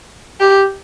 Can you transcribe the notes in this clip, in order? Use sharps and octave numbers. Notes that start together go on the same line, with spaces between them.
G4